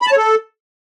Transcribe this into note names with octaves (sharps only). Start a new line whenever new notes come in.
B5
A5
C#5
A4